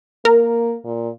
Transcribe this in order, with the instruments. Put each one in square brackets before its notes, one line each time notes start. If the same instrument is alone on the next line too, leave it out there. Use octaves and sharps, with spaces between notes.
[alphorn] A#3 [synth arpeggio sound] A#4
[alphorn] A#2